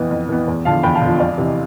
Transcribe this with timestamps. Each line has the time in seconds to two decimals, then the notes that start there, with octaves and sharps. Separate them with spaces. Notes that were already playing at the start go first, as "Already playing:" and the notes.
Already playing: F2 E3 B3
0.11 F2
0.29 E3 B3
0.48 E2
0.65 D3 F3 F5 A5
0.83 E2 G5 B5
0.95 F5 A5
1.01 D3 F3
1.20 F2 D5 F5
1.37 C3 E3